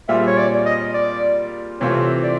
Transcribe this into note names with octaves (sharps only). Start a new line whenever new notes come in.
A#2 G3 C4 F4 G#4 E5
C#5
D5
D#5
D5
C3 E3 A3 C4 F4 C#5
D5